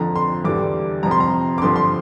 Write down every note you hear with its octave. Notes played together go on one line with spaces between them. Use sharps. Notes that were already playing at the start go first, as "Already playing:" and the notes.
Already playing: F2 D3 F3 A#5
C6
E2 D3 G3 D6
F2 C3 F3 A#5
C6
A#5
D6
G2 D3 F3 C6
C6